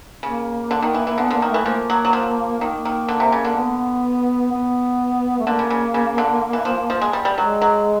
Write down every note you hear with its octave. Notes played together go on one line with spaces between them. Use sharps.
C#3 A#3
D3
D#3
E3
E3
D3 B3
D3 A#3
D#3
E3 A3
F3 A#3
F#3
F#3
F3
D#3 A#3
D#3
D3
C3
C#3
D3
B3
B3
A3
D3 A#3
C#3
C#3
C#3
D3
E3
F3
F3
G#3
G3
G3
F#3 G#3
F#3